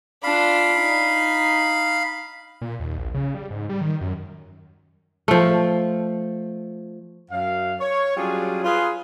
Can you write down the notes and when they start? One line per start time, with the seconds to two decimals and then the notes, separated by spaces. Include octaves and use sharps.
0.24 D4 F4 F5 B5
0.81 D#4
2.61 A#2
2.80 D#2
2.98 A#1
3.14 C#3
3.35 G3
3.51 G#2
3.69 G3
3.81 D#3
4.01 F#2
5.28 F3 A3
7.30 F#2 F5
7.80 C#5
8.17 F#3 G3 C#4 D4 F4 G#4
8.64 F4 G#4 B4